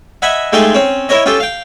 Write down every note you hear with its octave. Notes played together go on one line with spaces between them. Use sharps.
D#5 E5 F#5 G#5 B5
G#3 A3 D#4 F4 G4 G#4
C4 C#4
E4 A#4 C#5 D#5
C#4 F4 G4 A4
F5 G5